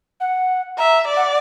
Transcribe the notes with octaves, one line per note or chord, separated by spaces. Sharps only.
F#5
E5 A#5
D5
F#5